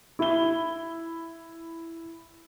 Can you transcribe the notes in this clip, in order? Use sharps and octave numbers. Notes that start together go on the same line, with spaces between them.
E4 E5 G7